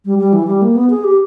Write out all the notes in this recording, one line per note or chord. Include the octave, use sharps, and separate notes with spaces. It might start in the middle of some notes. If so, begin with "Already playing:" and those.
G3
G3
E3
G3
A#3
B3
G#4
G4